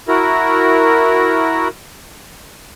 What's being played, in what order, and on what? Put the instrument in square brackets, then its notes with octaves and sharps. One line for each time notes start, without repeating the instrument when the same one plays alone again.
[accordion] E4 F#4 A#4